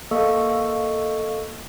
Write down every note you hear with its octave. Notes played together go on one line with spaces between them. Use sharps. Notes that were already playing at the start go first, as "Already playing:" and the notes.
A#3 A4 D#5 F5 C#6 E6